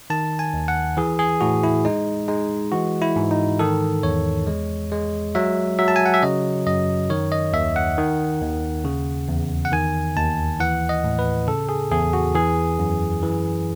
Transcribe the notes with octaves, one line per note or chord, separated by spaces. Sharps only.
D#3 A5
G#5
D#2
F#5
E3 G#4
G#4
A2 F#4
E4
G#3 D#4
G#3 D#4
E3 F#4
E4
G#2
D#4
D#3 A4
E2 C#5
G#3
G#3
F#3 E5
F#3 E5
A5
G#5
F#5
E5
C#3 D#5
F#2 D#5
D#3 C#5
D#5
D#2 E5
F#5
D#3
D#2
C#3
E2
F#5
D#3 G#5
D#2 A5
E3 F#5
D#5
A2
B4
C#3 A4
G#4
E2 G#4
F#4
E3 G#4
F#2
E3